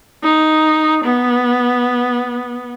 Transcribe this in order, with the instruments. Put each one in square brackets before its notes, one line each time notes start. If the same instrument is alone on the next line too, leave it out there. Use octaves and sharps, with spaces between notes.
[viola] D#4
B3